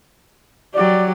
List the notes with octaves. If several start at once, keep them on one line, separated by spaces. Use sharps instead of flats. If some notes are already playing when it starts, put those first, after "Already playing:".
F#3 G4 D5